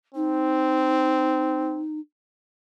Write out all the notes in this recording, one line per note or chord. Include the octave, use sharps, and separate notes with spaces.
C4 D#4